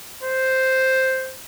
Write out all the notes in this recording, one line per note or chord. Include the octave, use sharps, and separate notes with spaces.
C5